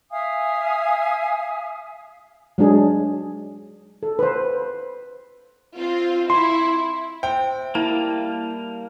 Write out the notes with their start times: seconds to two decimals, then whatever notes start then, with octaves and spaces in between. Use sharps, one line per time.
0.10 E5 F5 G#5 D#6
2.58 F#3 G#3 D4 G#4
4.03 A4
4.19 B4 C5
5.76 C4 F4
6.30 E4 C6
7.23 C5 E5 G5
7.75 G3 A#3 E4 A5